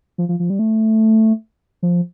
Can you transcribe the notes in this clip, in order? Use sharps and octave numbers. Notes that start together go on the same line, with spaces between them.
F3
F3
F3
G3
A3
F3